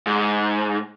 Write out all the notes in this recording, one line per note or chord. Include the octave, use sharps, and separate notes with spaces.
G#2